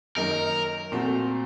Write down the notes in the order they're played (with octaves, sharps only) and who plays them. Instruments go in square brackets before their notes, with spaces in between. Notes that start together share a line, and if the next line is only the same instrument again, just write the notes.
[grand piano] F#2 D#3 A#3 D#4 [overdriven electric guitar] A#4
[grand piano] A#2 A3 C4 F#4